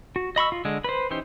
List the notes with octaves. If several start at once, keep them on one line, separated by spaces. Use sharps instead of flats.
F#4
D#5 B5 C#6 E6
F4
D3 G#3
B4 C5
E3 C#4 D#4 G4 C5